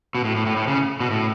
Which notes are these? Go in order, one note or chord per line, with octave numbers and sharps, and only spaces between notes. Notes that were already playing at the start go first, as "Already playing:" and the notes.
B2
A2
A2
A2
A2
C#3
B2
A2